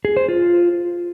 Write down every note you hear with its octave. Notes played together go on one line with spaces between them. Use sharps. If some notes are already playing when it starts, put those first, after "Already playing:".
G#4
C5
F4